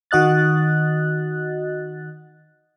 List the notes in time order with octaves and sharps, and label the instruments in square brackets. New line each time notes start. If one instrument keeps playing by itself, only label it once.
[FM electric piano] D#3 F#4 D#5 F#6 A6